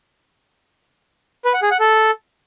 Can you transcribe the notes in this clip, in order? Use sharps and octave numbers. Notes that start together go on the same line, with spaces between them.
B4
F#5
G#4
F#5
A4